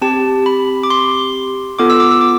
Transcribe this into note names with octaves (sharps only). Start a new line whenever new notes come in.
C4 G4 A5
B5
D6
C6
B3 F4 A4 D6
E6
D6
E6
D6